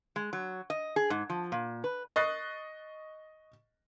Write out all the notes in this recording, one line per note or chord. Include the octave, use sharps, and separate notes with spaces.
G#3
F#3
D#5
G#4
G#2
F3
A#2
B4
D#5 C#6 D#6 F#6 A6 C7